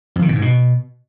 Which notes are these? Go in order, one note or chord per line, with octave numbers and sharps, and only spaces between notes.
F2
D#3
A#2
G#2
B2